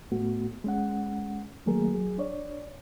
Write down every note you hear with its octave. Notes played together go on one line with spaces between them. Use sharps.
A2 A3 B3 F#4
G#3 C#4 F#5
D#3 F#3 A3 A#3 G#4 A#4
F#3 G#4
D4 C#5 D5